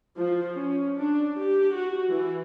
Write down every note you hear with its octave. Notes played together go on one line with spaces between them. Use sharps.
F3
C#4
D4
G4
F#4
E3